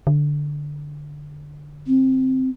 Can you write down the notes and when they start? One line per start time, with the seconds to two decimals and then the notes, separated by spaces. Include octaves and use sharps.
0.07 D3
1.87 C4